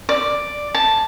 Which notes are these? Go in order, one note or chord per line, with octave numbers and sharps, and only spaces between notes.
D5
A5